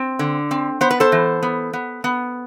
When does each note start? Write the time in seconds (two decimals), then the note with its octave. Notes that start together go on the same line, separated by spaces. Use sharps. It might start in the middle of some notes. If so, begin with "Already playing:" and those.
Already playing: C4
0.19 D3
0.51 C4
0.81 B3 C5
0.91 B4
1.00 A4 C5
1.12 E3
1.43 B3
1.73 B3
2.04 B3